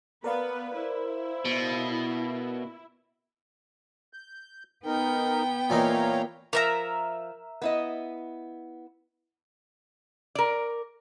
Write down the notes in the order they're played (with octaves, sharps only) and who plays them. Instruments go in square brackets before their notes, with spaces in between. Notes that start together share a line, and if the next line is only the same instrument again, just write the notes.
[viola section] B3 B4 [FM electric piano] A#4 D5 F5
[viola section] E4 [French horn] C5
[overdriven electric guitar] B2
[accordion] G6
[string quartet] B3 G5 [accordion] D#4 A#4
[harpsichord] A#2 E3 D#4 [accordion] C#5 F5 A#5
[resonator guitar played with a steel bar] F3 [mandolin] A#4 E5 A#5
[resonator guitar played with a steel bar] B3 E4 D#5
A#4 D5